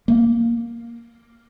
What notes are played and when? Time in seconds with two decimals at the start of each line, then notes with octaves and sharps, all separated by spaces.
0.08 A#3